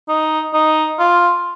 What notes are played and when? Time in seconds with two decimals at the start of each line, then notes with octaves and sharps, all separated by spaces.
0.08 D#4
0.53 D#4
0.99 F4